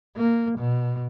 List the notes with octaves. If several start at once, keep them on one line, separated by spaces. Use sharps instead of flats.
A#3
B2